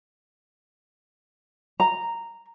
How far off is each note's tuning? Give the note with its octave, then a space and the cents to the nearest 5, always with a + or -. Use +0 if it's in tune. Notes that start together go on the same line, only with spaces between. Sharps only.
A#5 -10